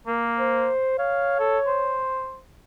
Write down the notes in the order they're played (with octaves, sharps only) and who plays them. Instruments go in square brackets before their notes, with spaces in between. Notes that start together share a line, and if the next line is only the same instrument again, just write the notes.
[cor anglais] A#3 [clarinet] A#4
[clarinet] C5
[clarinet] C#5 [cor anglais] F5
[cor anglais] A4
C5